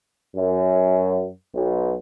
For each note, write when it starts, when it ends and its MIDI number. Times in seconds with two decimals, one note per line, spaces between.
0.36 1.28 42
1.54 1.95 35